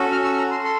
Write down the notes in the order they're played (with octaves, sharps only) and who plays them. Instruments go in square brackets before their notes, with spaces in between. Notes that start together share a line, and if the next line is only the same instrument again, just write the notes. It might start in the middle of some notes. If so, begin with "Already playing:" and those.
Already playing: [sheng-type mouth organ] C#4 F#4 A4
F6
E6
A#5
C6
A4 C6